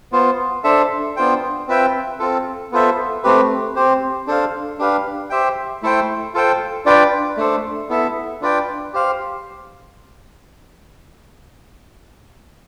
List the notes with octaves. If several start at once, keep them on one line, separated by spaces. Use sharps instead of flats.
B3 F4 C5
D4 A4 C5 E5
B3 D4 F4 C5 G5
C4 F4 B4 E5 G5
C4 F4 A4
B3 F4 A4 C5 E5
A3 C4 G4 B4
C4 G4 C5
D4 A4 C5 F5
D4 G4 B4 F5
G4 C5 E5 G5
A3 E4 A4 C5 G5
F4 A4 C5 G5
D4 F4 B4 D5 G5
A3 D4 A4 C5
B3 E4 A4 E5
D4 F4 B4 D5 G5
G4 C5 F5